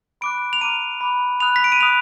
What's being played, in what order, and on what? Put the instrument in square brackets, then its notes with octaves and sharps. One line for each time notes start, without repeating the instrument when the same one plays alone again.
[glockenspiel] B5 D6 F#6 D7
F7
A#5 D6 F6 D#7
B5 D6 F#6
B5 D#6 F#6 F7
B6
D7
D#7
B5 D#6 F#6 F7